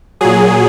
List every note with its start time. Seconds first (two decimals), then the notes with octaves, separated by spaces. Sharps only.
0.21 A#2 F#3 G#4